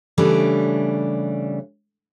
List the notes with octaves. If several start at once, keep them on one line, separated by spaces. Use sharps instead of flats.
C#3 E3 G3 A3 D4